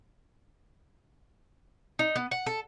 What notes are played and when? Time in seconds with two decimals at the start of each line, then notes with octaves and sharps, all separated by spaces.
1.99 D#4
2.16 B3
2.31 F#5
2.46 A4